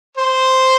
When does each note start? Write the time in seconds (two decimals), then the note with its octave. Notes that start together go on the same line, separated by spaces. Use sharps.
0.17 C5